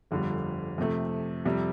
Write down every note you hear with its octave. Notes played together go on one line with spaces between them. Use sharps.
G1 F2 D3 G3
F2 C3 A3
F2 C3 G3